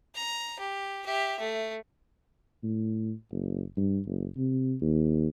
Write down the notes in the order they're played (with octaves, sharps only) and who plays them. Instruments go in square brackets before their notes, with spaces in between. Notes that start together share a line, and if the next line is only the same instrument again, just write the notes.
[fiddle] A#5
G4
G4 E5
A3
[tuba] A2
F#1
G2
F#1
C3
D#2